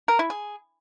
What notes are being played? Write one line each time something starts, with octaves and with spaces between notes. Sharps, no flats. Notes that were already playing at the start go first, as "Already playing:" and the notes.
A#4
E4
G#4